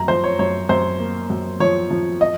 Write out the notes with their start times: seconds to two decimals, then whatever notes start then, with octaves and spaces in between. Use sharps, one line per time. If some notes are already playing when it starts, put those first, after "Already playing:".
Already playing: F#2 A#5
0.08 F3 C5
0.24 C#5
0.39 F#2 C#5
0.69 F#2 C5
1.00 A#3
1.30 F#2
1.60 F3 C#5
1.91 F3
2.21 D#5